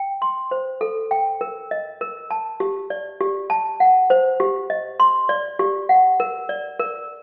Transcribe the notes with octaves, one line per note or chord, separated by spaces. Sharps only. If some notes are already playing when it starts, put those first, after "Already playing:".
Already playing: G5
C6
C5
A4
G5
A#4
D#5
A#4
A5
G4
D5
G4
A5
F#5
C5
G4
D#5
C6
D5
G4
F#5
A#4
D5
A#4